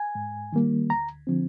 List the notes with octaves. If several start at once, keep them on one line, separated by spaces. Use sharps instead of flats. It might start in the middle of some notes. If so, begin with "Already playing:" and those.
Already playing: G#5
G#2
D#3 G3 A#3
D2 A#5
D3 F3 C4